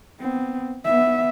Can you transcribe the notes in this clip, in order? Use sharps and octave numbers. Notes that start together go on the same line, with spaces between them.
B3 C4
B3 E5